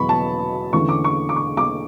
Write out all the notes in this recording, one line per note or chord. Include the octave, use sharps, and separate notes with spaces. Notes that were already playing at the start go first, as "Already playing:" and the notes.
Already playing: E2 B2 F#3 B3 B5 C#6
A5
E2 D3 A3 C#4 C#6
D6
C#6
D6
C#6
D6